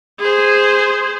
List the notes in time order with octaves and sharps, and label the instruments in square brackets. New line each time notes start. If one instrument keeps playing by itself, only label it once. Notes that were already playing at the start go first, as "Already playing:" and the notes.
[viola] G#4 C5